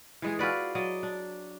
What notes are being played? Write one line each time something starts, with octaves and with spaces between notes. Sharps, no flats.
E3 G#3 G#4
F4 F#4 B4 D5
F#3 D5 D#5
D4